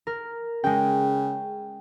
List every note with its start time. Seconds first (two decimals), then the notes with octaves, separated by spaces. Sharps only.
0.07 A#4
0.64 C#3 G#3 G5